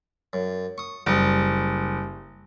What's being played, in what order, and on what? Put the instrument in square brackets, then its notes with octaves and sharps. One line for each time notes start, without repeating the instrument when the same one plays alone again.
[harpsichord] F#2
C#6 D#6
[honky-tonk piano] F#1 [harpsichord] G3